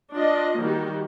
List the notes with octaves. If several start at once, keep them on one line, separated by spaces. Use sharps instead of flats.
D4 F4 D#5
D#3 G3 A#3 F#4 G4